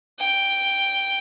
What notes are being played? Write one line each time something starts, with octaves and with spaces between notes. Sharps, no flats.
G5